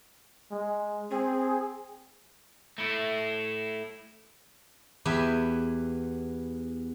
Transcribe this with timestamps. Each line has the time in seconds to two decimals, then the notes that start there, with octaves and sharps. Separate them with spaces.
0.51 G#3
1.11 C4 G#4
2.78 A3 E4
5.05 E2 B3 G4 E5 G#5